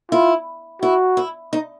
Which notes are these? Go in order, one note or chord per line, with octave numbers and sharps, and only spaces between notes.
E4 F4
E4 F#4
E4
D#4